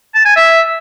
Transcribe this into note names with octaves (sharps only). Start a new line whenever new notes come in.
A5
G#5
E5